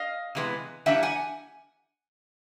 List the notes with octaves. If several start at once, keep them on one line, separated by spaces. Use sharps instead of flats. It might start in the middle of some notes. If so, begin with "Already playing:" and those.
Already playing: D#5 F5
C3 E3 G#3 B3
E3 G3 A#3 D4 E5 F#5
F#5 G#5